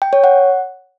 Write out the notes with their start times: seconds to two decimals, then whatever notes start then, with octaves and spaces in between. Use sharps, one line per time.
0.02 G5
0.13 C#5
0.24 F#5